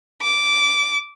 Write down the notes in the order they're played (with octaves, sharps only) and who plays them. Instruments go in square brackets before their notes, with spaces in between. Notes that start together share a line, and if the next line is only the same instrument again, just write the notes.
[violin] D6